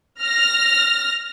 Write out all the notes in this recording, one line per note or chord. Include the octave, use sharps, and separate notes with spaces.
F6 A#6